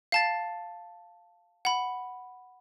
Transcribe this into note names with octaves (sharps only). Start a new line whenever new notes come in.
F5 A5 A6
F#5 B5